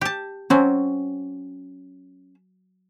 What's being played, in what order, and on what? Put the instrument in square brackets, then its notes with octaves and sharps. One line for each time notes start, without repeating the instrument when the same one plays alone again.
[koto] G4 A5
[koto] F#3 C4 [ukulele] C#4